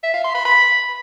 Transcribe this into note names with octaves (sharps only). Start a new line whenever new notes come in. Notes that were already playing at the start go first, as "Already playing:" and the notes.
E5
F5
C6
B5
B5